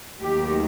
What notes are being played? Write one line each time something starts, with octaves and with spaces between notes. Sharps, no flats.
D#2 D#3 F#3 A3 G4